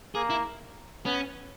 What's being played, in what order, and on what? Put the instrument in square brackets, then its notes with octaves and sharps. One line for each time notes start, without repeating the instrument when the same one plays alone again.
[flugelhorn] A#3 [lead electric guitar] G#4
[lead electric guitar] E4
[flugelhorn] B3 [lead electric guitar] C#4